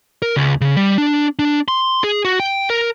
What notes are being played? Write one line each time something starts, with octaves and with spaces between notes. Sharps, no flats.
A#4
C#2
C#3
G3
D4
D4
C6
G#4
F#4
G5
A#4